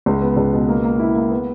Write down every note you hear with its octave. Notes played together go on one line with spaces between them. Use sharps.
C#2
B3
C#2
B2
A#3
A#3
E4
A#3
B3